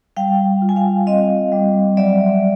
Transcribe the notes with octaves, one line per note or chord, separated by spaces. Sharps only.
G3 F5 G5
F4
G#5
F5 G5
C4 D#5 F5
G3
F#3 D5 E5